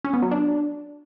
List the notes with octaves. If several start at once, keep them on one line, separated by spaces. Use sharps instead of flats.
C#4
B3
F#3
D4